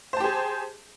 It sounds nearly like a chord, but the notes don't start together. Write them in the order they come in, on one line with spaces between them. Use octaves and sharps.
C5 A5 G4 G#4